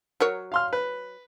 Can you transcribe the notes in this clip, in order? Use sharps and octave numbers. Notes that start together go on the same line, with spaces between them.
F#3 A#4 C#5
F5 C6 F6
B4